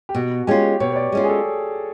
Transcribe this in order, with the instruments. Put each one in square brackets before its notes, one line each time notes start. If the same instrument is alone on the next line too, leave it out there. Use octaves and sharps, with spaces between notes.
[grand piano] G4
[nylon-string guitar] B2 [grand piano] F#4
[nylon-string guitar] G#3 C#4 F4 [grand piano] G4
[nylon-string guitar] B2 [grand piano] C#5
[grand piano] C#5
D5
[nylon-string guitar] G#3 C#4 F4
[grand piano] G#4
A4